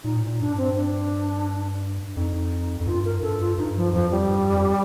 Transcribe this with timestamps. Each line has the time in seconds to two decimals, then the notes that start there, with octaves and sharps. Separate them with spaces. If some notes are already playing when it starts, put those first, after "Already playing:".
0.04 A#2 D#4
0.16 A2
0.27 A#2
0.40 G2 D4
0.57 C4
0.76 D4
2.17 F2 D#4
2.81 F2
2.87 G2 F4
3.05 A#4
3.22 G2 A4
3.40 F4
3.58 G2 D#4
3.76 F3
3.93 F2 F3
4.11 G3
4.29 G2
4.52 F2